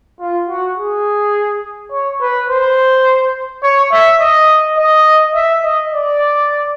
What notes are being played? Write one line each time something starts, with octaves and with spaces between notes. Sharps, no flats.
F4
F#4
G#4
C#5
B4
C5
C#5
E5
D#5
D#5
E5
D#5
D5